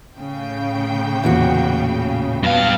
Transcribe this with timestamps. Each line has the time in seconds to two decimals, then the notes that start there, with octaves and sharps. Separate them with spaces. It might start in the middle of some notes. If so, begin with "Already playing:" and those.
0.18 A2 C#3 G5
1.24 E2 A#2 F#4
2.43 G2 F#3 B3 F5